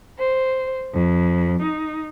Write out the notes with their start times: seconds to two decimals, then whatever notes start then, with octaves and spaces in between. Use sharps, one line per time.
0.18 C5
0.95 F2
1.63 D#4